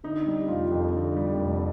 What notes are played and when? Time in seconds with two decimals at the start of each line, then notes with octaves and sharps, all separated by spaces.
0.04 D3 D#4
0.27 G3
0.48 F1 F4
0.71 F2
0.95 D3
1.16 G3
1.39 F1